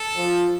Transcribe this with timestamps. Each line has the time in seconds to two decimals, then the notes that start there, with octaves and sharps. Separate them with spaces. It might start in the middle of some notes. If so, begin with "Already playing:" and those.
Already playing: A4
0.17 F3